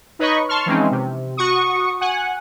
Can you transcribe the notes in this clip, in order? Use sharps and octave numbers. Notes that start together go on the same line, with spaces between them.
D#4 B4 C#5 D#5 B5 C#6
A5 C6 C#6 F6
E3 F3 G#3 C4 C#4 D#4
C3
F#4 C#6 D#6
F#5 G#5